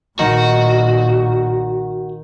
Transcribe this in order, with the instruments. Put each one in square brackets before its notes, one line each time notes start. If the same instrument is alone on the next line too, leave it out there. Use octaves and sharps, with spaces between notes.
[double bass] B1 A#2 [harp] D#3 [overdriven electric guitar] F#4